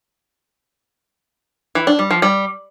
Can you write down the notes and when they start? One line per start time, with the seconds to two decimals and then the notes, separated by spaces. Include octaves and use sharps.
1.75 E3
1.87 D4
1.99 G3
2.11 F3
2.22 G3